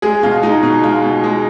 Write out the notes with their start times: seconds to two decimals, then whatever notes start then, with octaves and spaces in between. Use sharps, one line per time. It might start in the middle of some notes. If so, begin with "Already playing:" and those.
0.02 G#3 G#4
0.23 B2 F4
0.43 G#3 D#4
0.63 B2 D#4
0.83 G#3 F4
1.04 B2
1.24 G#3